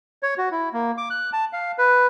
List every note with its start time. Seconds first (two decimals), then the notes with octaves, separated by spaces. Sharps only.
0.23 C#5
0.38 F#4
0.52 E4
0.73 A#3
0.97 D6
1.10 F#6
1.33 A5
1.53 F5
1.78 B4